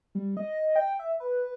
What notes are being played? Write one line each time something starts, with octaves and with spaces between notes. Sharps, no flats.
G3
D#5
G5
E5
B4